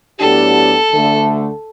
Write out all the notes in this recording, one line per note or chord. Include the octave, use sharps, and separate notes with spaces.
A2 F#3 B3 D4 G4 A4
D2 D3 A3